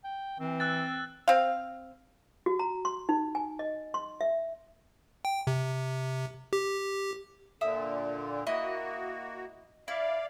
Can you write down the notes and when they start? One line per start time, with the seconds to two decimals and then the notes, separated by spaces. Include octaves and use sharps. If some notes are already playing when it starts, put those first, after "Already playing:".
0.04 G5
0.40 E3 C4
0.60 E6 F#6 A6
1.28 C4 F5
2.46 F#4
2.59 A#5
2.85 C6
3.09 D#4
3.35 G#5
3.59 D#5
3.94 C6
4.21 E5
5.25 G5
5.47 C3
6.53 G4
7.61 A#2 D3 E5 D#6
8.47 A#3 E4 F#4 D#5
9.88 E4 D5 F5